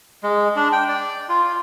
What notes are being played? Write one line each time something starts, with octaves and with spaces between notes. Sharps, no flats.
G#3
D4
G5
D5
F4